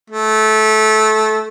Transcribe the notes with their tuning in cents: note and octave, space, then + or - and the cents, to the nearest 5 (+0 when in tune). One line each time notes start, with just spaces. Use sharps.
A3 -20